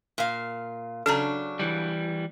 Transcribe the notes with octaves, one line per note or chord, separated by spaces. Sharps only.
A#2 F5
C#3 F#3 D4 A4 A#5
E3 G3